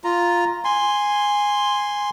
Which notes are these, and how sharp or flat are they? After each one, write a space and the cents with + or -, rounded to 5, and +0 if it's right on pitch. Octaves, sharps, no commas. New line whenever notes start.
F4 +0 A#5 +0
G#5 -10 C6 +0